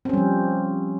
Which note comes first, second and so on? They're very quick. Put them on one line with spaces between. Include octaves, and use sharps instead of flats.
C4 C#4 G3 F3